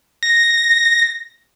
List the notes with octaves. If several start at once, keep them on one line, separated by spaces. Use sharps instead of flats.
A#6